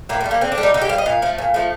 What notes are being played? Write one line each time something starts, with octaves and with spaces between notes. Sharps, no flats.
A2 A#3
A3
G3
A#3
D3 C4
D4
G3
D#4
D3 D#4
G4
G3 F5
D#5
A#2 F5
F3 A3
A#2
F3 A3